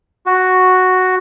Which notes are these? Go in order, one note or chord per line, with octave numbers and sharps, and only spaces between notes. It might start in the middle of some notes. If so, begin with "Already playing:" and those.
F#4